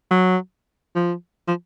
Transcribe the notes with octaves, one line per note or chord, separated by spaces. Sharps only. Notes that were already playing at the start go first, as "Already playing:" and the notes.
F#3
F3
F3